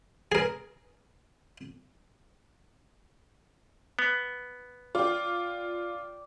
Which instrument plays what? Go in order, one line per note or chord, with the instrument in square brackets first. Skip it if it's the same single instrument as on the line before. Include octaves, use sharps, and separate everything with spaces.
[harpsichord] G#4 A#4
[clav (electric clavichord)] B3
[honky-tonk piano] F4 [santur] D5 G5